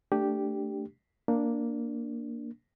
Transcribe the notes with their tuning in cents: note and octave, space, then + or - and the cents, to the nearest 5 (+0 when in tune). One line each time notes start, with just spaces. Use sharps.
A3 +10 D4 +0 G4 +0
A#3 +0 D4 +0